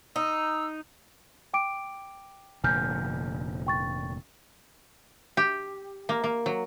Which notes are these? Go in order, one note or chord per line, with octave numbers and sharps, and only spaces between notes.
D#4 E6
G5 D6 D7
F1 A#2 D3 G#5 F6 G6
G5 C#6 A6
G4
A#3
A#3
F#3